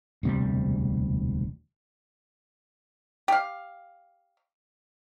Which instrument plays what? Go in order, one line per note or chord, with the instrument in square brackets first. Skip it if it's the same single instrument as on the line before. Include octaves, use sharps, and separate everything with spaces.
[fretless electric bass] E1 D2 C3 G3
[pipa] G4 F5